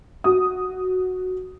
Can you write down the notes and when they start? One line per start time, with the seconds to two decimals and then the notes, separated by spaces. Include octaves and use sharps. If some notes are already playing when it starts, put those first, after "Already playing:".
0.24 F#4 D#6